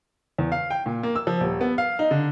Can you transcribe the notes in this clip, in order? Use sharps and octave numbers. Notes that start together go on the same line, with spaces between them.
E2
F5
G5
A#2
A#3
E6
F3
D#1
B3
F5
D#4
D3